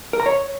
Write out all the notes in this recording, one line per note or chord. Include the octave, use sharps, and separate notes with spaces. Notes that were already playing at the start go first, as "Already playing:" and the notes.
A#4
A#5
C#5